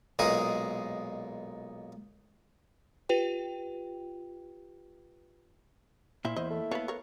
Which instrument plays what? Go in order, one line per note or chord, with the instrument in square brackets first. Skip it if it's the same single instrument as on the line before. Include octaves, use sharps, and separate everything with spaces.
[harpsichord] B1 A#2 G#3 D#4 G#4
[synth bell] F4 G4 B4 G5
[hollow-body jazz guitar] A#2 [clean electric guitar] A#3 E4 E5 [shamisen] C5
[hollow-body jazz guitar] E2 [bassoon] C5 [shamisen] D#5
[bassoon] A3
[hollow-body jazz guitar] B3 A4 F5 [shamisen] B4 C#5
[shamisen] A#4 C#5